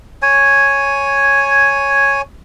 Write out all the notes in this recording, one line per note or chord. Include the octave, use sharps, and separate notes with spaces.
C#5 G#5